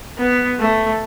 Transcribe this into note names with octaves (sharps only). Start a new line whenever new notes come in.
B3
A3